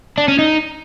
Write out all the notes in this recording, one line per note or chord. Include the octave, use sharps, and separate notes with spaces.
D4
C#4
D#4